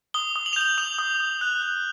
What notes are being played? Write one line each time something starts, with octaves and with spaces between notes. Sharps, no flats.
D#6 G7
D#6
F#7
F7
G6 F#7
D#6 F7
D#6
D#6
F#6
F#6